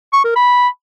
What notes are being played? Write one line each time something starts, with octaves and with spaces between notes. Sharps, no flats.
C#6
A#4
B5